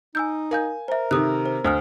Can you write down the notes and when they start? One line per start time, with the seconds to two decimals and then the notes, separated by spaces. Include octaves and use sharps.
0.15 D#4 G#5 E6 G6
0.51 A#4 F5 G#5 G6
0.88 A#4 C5 E5
1.11 C3 D#3 A4 D#6 F#6
1.46 C5
1.64 D2 C5 D#6 F6